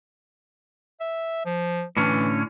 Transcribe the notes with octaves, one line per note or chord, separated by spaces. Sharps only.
E5
F3
A2 D3 E3 C#4